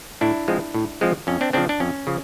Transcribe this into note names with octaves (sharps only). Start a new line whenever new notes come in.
A2 D4 E4
F3 G#3 C4
A2
F3 G#3 C4
F2 C#4
C4 D4
C#3 F3 C4 D4
D4
F2 C#4
C#3 F3